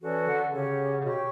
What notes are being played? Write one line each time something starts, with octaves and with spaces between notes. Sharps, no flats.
E3 C#4 F#4 A4 D5
D3
C#3 C#4 G4 C#5 F#5
C#3
B2 G4 C#5 G5 C#6